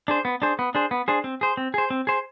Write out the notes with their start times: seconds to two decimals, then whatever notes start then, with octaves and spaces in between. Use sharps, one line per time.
0.08 D4 G#4 C5
0.25 B3
0.42 D4 G#4 C5
0.59 B3
0.75 D4 G#4 C5
0.91 B3
1.08 D4 G#4 C5
1.24 C4
1.41 G#4 C5
1.57 C4
1.74 G#4 C5
1.90 C4
2.07 G#4 C5